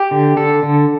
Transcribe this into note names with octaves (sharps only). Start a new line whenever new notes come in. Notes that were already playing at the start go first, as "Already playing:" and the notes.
Already playing: G4
D3
D3 A4
D3